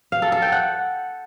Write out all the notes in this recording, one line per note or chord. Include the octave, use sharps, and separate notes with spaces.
F5
A4
A4
G5
F#5